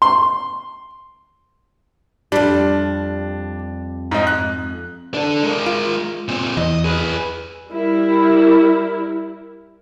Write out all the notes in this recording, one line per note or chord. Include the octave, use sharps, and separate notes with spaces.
C6
F2 G3 D4
G#2 D#4
F#6
D4 A4
G#3 A#4
F4
A#2 C4
E2 D#5
G#4 B4
G3 E4 A#4